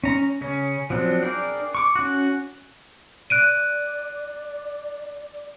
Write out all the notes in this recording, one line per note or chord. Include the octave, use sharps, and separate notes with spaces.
C#4 A#5
C#3 C#4
F3 F#3 C4 D4
D4 G#4 A#4 D5 G5
C#6 D6
C#4 F#4
D5 F#6 D7 D#7